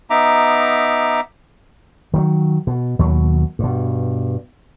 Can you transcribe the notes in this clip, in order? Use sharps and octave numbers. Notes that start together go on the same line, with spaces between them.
B3 D#4 E5 A#5 D6
D#3 E3 F#3
B2
D#2 B2 F#3
G2 B2